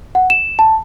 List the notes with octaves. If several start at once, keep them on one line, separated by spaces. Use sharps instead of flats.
F#5
E7
A5